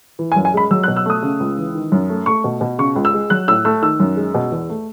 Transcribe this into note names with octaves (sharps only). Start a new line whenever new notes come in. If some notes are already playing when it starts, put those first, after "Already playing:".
E3
G#5
F#2
G#5
G#3 B5
F#3 E6
F#6
B2
E6
A3 D#6
C#3
C#2
E3
D#3
F#2
A3
A3 C#6
B2
B2
C#3 C#6
C#2
E6
G#3
F#3 F#6
A2 E6
A3 E6
D#3 E6
F#2
G#3
B2
E2
A3